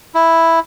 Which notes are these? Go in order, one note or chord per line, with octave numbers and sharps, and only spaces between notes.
E4